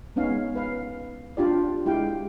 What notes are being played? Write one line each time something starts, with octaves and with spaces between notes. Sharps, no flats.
G#3 B3 C#4 D#4 F5
B4 F5
D4 F4 G4 D5
G#3 E4 G4 F5 G5